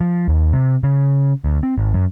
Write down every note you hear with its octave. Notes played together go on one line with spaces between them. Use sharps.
F3
D#2
C3
C#3
D2
C4
G#1
F#2